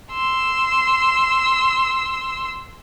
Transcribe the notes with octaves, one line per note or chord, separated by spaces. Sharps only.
C6 E6